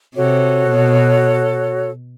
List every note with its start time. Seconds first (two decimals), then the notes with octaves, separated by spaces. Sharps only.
0.15 C3 F#4 A4 C#5
0.70 B2